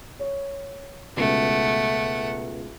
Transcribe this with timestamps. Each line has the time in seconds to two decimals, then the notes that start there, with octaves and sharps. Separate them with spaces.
0.19 C#5
1.17 C#2 B2 A3 F#5